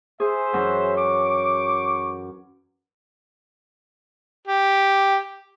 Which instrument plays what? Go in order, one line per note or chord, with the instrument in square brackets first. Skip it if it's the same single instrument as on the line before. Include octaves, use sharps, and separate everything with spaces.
[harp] G#4 [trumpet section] C5 E5
[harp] F#2 E3 F#3
[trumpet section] C#6 D6
[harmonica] G4